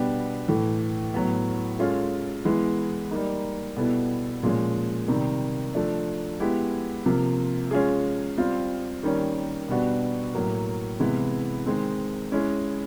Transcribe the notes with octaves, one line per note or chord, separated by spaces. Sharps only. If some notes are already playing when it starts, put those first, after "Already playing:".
Already playing: B2 G3 B3 D4 G4
A2 E3 A3
A2 F#3 B3
G#3 C#4 F4 A4
E3 G#3 B3 E4
G3 A#3 D#4
B2 G3 B3 E4 A4
A#2 F3 G#3 C#4
C3 D#3 G3
F3 A3 D4
G#3 B3 E4 G4
C3 F3 A#3
G#3 C#4 F4 G#4
G3 C4 F4
D#3 G3 A#3 C#4
B2 G3 B3 D4 F#4
A2 F#3 A#3
C3 E3 G#3 B3 E4
D#3 G#3 C4
G#3 C#4 E4